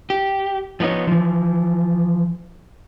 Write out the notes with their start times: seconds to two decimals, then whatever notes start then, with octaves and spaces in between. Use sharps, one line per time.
0.10 G4
0.80 F3 G#3 B3 D#4 C#5
1.07 E3 F3